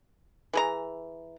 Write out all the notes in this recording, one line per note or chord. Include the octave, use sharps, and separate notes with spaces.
E3 G#4 A#5